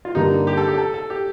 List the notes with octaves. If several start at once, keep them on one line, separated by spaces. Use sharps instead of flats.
F4
G2 D3 G3 A#3 D4 D#4
G4
A4
G4
A4
A4
G4